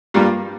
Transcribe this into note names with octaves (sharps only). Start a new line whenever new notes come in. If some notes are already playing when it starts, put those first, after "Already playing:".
G2 G3 A#3 F4